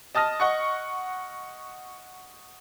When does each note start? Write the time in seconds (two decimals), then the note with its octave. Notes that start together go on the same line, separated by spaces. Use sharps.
0.15 D#5 A5 D#6 F6 A#6
0.40 D#5 F#5 C#6